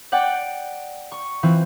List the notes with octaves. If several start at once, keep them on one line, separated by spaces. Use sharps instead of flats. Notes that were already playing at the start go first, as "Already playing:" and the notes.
D5 F#5 G5 F#6
C#6
E3 C4 F4